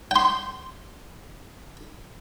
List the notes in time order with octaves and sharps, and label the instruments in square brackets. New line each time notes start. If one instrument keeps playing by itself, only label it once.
[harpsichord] G5 C6